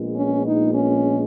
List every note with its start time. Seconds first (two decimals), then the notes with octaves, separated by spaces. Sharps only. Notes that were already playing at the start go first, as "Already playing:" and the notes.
Already playing: A#1 A#2 G#3 B3
0.15 C#4
0.44 D#4
0.74 C#4